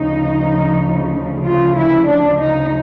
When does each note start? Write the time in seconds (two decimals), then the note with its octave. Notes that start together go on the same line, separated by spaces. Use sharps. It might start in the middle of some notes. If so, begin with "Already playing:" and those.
Already playing: D2 C#3 F3 D#4
1.45 F4
1.77 E4
2.08 D4
2.40 D#4